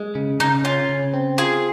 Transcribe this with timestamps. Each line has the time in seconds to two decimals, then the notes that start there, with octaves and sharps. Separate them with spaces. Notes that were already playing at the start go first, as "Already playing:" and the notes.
Already playing: G#3
0.15 C#3
0.40 C#3 D#4
0.64 C#4 F4
0.89 C#3
1.14 C4
1.38 F4 G#4